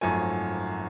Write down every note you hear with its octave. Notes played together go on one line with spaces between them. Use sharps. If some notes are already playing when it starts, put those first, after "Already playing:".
G#1 F#2 F3 A3 G#5